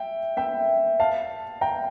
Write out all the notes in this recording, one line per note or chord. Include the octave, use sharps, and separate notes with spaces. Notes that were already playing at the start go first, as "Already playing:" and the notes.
Already playing: E5 G5
E5 G5
F5 A5
G5 A#5